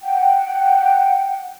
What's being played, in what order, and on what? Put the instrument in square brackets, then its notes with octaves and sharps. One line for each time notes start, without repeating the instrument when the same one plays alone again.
[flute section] F#5 G5